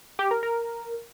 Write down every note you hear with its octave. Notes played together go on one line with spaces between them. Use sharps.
G4
A#4
A#4